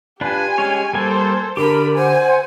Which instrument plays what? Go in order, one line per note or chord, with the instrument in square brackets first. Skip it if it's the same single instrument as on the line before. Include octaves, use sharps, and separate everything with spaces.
[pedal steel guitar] D4 F4 B4 [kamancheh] G4 G#5
[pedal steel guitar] G#3 C#4 C#5
[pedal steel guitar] G3 A#3 G#5 [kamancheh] A4 C5
[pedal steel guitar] D3 G4 [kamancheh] D4 B5 [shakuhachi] A#4
[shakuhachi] C5 [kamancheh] F#5 G#5